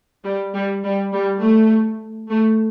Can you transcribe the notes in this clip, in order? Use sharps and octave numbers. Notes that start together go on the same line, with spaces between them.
G3
G3
G3
G3
A3
A3